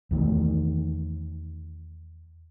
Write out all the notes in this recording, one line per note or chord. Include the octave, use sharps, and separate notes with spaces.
E2 D#3 A3